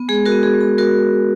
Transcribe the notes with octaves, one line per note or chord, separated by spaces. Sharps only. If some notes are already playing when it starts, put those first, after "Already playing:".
Already playing: B3
G#3 G#4
F#4 A#4
B3
G#4
G#3
G#4
G#3 F#4 A#4